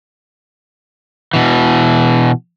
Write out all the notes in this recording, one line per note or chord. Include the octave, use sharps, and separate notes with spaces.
B2 E3